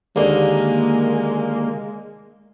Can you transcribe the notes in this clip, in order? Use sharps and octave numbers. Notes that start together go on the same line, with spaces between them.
D#2 D3 G#3 A#3